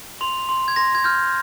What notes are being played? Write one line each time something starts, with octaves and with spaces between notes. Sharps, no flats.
C6 F7
C6
G#6
C6 A#6
G#6
F6 G6